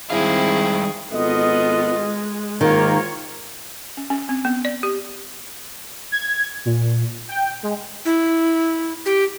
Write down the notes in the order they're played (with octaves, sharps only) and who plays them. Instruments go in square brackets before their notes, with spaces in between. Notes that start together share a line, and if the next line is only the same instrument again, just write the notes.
[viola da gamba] D#3 G#4 [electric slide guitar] G3 G#3 F5 [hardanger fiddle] C4 E4
[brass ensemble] G#1 A4 D#5 [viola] B3 F4
[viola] G#3
[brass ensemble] G#2 A#3 [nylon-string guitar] D#3 [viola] F4 C#5
[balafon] C#4
C#4
C4
B3
D5
G4
[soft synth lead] G#6
A#2
G5
G#3
[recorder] E4
G4